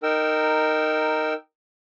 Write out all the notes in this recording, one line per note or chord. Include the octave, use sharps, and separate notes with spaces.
D#4 A#4 G5 E6